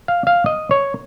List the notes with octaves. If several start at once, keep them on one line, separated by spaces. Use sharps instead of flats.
F5
F5
D#5
C#5